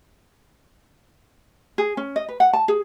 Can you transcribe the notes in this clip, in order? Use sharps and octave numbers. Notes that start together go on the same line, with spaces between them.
G#4
C#4
D#5
B4
F#5
A5
G#4